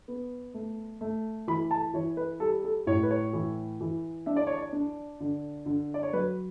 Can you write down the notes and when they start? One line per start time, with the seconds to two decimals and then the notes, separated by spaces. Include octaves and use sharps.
0.08 B3
0.54 A3
1.01 A3
1.48 E3 B5
1.71 A5
1.94 E3 C#5
2.17 B4
2.40 G3 A4
2.64 A4
2.87 A2 C#5
3.03 B4
3.11 C#5
3.33 E3
3.81 E3
4.26 D4 E5
4.36 D5
4.47 C#5
4.57 D5
4.73 D4
5.20 D3
5.66 D3
5.94 D5
6.03 C#5
6.13 F#3 B4